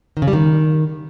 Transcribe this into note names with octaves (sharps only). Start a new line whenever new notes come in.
D#3
C#3
G3
D#3